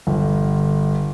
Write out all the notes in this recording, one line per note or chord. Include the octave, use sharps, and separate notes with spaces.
G1